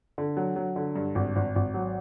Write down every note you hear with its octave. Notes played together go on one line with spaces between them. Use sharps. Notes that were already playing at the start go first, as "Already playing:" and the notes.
D3
F#3
F#3
D3
G2
G#1
G#1
G#1
F#3